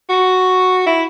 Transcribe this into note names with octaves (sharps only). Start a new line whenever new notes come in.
F#4
E4